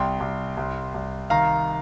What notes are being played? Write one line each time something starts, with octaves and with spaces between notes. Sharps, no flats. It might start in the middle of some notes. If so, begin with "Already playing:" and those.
Already playing: C2 G5 C6
C2
C2
C2
D#3 F5 A#5